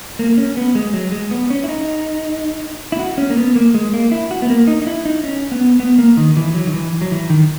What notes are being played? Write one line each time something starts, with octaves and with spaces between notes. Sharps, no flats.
A#3
C#4
B3
G#3
F#3
G#3
B3
C#4
E4
D#4
E4
F#4
C#4
A#3
B3
A#3
G#3
A#3
E4
F#4
B3
A#3
D#4
D#4
E4
D#4
C#4
B3
B3
A#3
D#3
E3
F#3
D#3
E3
F#3
E3
D#3